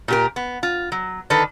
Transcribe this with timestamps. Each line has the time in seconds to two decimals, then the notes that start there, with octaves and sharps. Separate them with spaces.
0.08 A#2 G4 A#4
0.36 B3
0.63 F4
0.92 F#3
1.30 D3 D#3 A4 B4